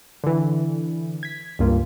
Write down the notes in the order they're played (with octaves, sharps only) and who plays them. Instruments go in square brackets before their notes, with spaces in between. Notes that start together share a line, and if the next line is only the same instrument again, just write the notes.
[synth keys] D3 E3
G#6 B6
C#2 G2 A#3 F4